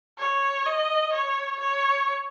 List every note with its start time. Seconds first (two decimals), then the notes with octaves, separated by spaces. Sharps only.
0.18 C#5
0.66 D#5
1.13 C#5
1.60 C#5